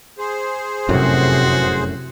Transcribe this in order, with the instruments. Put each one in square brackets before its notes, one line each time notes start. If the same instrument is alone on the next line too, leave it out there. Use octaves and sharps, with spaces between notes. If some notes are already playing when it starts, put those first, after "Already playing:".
[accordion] G#4 C5
[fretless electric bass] F1 F#2 A2 [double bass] C3 [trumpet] F#4